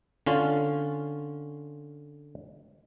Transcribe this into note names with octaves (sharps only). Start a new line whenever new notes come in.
D3 C#4 F4